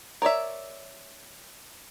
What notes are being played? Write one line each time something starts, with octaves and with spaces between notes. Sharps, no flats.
A#4 C#5 D5 E5